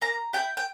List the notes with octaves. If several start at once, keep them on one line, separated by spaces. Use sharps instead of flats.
A#3 A#5
E4 G4 G5
G5